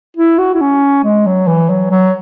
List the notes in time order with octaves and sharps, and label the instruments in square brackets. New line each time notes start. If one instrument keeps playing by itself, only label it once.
[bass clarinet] E4
F#4
E4
C#4
G#3
F#3
E3
F#3
F#3